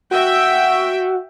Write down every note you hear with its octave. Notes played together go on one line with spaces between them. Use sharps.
F#4 E5 G5